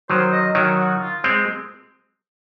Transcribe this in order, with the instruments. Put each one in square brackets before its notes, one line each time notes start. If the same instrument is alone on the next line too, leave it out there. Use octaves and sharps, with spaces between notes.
[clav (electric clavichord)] D#3 F#3 [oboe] C5
[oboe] D#5
[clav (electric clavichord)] D#3 F#3 [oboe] C#5
[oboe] F#4
F4
[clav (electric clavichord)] G#3 C4